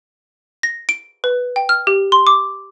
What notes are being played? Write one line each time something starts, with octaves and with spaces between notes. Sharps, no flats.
A#6
D7
B4
G5
F6
G4
C6
D6